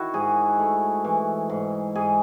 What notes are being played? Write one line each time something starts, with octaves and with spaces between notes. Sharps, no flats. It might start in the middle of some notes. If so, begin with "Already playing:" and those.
Already playing: D#3 E4 F#4
G#2 G#4
A3
E3
G#2
G#2 G#4